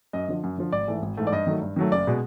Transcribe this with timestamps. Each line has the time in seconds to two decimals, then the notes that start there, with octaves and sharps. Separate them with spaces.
0.13 F#2 D#5
0.28 D3 F3
0.43 F#2
0.58 D3 F3
0.72 G#1 D5
0.87 G#2 E3 A3
1.02 G#1
1.17 G#2 E3 A3
1.27 D5
1.32 G2 D#5
1.47 D#3 F#3 A3
1.62 G2
1.76 D#3 F#3 A3
1.92 F#1 D5
2.07 B2 G#3